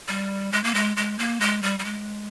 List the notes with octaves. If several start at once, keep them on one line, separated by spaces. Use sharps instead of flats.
G3
G#3
A#3
G#3
G#3
A#3
G#3
G3
G3
G#3